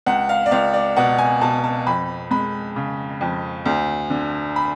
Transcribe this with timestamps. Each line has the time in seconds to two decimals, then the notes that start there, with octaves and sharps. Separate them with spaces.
0.06 C#2 F#5
0.29 F5
0.46 D5
0.51 C#2 F5
0.73 D5
0.96 B2 F#5
1.18 G#5
1.41 B2 A5
1.64 A5
1.87 F2 B5
2.31 G#3 B5
2.76 C#3
3.21 F2
3.66 D2
4.10 D3
4.56 B5